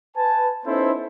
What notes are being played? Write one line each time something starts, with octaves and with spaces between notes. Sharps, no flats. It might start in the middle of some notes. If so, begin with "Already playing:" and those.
B4 G#5 A5
B3 C#4 D#4 E4 A4 C5